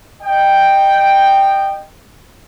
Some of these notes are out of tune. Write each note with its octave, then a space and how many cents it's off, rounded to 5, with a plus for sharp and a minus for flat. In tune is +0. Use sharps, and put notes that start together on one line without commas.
D#5 -30 G5 +0